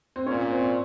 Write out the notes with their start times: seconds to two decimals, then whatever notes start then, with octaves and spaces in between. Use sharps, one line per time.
0.16 C4
0.26 A#2 C#4
0.51 C4